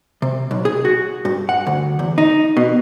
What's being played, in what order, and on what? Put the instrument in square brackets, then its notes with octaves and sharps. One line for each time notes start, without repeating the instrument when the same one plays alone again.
[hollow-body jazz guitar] C3
B1
G#4
F#4
G2
F#5
D2
E2
D#4
B2